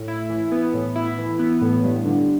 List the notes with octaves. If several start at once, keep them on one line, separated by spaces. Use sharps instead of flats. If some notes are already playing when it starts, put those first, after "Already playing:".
Already playing: A2
E4
E3
B3
A2
E4
E3
B3
A2
G2
D3